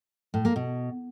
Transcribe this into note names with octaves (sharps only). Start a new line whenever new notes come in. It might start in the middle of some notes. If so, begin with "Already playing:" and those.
A2
A#3
B2